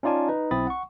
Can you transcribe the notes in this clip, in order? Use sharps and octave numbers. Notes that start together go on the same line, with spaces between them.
C#4 D#4 F4 D5 G#5 A5
D#4 B4
B1 C4 E4 B5 D#6 A6
F#5 C#6